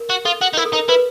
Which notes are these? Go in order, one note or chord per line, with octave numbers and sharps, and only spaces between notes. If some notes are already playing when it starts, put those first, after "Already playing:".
Already playing: A#4
F#4
F4 A4
F#4
D#4
E4 A#4
A4
D#4 A#4
E4 B4